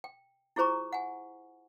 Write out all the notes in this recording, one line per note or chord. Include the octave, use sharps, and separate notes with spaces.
G5
E4 F4 G#4 C5 A#5 C#6
F#5 G#5